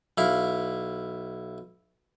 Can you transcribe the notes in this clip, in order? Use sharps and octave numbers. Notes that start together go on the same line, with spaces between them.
B1 E4 F5